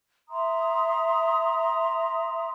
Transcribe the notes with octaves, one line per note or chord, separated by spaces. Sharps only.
E5 A#5 C6 D#6